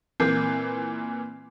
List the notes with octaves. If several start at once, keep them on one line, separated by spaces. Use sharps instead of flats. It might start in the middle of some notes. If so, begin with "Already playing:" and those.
A#2 E3 A#3 C4